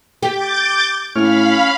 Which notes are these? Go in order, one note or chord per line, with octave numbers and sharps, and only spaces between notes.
G4 D6 G6 A6
A2 C#4 F5 B5 F6